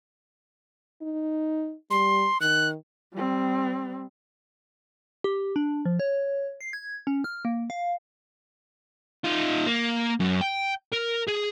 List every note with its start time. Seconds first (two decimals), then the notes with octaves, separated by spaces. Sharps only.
1.02 D#4
1.91 G3 C6
2.41 D#3 F#6
3.14 G3 C4
5.24 G4
5.56 D4
5.85 F3
6.00 C#5
6.61 C7
6.73 G#6
7.07 C#4
7.24 F6
7.45 A#3
7.70 F5
9.25 D#4 F4
9.67 A#3
10.20 F#2
10.41 G5
10.93 A#4
11.28 G#4